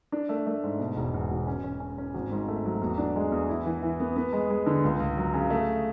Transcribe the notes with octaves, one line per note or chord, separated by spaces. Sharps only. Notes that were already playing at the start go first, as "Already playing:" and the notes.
D4
A3
A3
G#2
B2
E1
E2
E1
C#4
C#4
C#4
C#4
G#1
G#2
A3
F#3
E2
D4
G#3
E2
E4
E3
E3
B3
B3
G#3
G#3
D3
C#2
C#2
F#3
C#3
A3